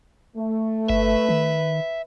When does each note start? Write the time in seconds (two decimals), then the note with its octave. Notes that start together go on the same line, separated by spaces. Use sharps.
0.36 A3
0.89 G1 B4 E5
1.29 D#3